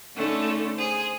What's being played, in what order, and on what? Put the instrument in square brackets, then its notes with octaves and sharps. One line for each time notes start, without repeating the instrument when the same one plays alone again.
[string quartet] D3 A3 C#4 D#4
G#4 C5